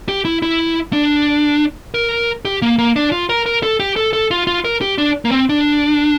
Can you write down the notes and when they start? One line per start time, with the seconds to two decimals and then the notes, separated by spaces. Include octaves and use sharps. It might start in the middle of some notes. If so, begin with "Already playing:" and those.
0.09 G4
0.25 E4
0.42 E4
0.93 D4
1.94 A#4
2.45 G4
2.62 A#3
2.78 A#3
2.96 D4
3.12 F4
3.29 A#4
3.46 A#4
3.63 A4
3.80 G4
3.96 A4
4.13 A4
4.31 F4
4.47 F4
4.65 A#4
4.81 G4
4.98 D4
5.25 A#3
5.31 C4
5.49 D4